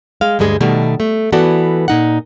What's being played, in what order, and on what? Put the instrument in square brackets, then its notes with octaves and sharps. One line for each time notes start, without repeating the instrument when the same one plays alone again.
[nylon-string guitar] G#3 F5
D2 G2 G3 G#3 G#4
B2 D#3 G3 A3
A3
E3 B3 F#4 A4 D5
A#2 D#4 F#5